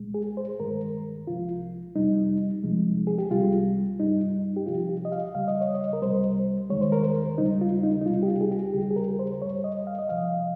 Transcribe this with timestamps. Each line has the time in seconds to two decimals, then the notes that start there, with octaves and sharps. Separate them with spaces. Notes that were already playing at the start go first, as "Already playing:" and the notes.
Already playing: C2 A#2 G#3
0.14 G#4
0.37 C5
0.60 G2 D#3 G#3 A#4
1.27 C2 C3 F3 F4
1.95 F2 C3 G3 D#4
2.63 C#2 C3 F3 G#3
3.07 G#4
3.18 G4
3.31 C2 C3 G3 F4
3.99 G2 G3 D#4
4.56 G4
4.67 C#2 C3 F3 F4
4.89 G4
5.05 D#5
5.12 F5
5.34 C#2 C#3 G3 F5
5.48 D#5
5.61 C#5
5.74 D#5
5.93 A#4
6.02 C2 C3 G3 C5
6.70 D#2 D#3 G#3 C#5
6.81 C5
6.92 A#4
7.03 C5
7.38 D#2 C#3 G3 D#4
7.61 F4
7.84 D#4
8.01 D#4
8.05 C#2 C3 G3 F4
8.23 G4
8.28 F4
8.41 G#4
8.51 G4
8.74 D#2 C#3 G3 G4
8.91 G#4
8.96 A#4
9.19 C5
9.42 G2 G3 C#5
9.64 D#5
9.87 F5
9.99 D#5
10.09 C#2 C3 F3 F5